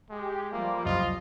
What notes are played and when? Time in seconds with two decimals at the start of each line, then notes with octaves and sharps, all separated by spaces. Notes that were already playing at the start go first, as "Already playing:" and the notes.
0.10 G#3 G4
0.52 F3 G3 A3 A#3 F4 D6
0.85 F1 C2 F#2 F4 D#5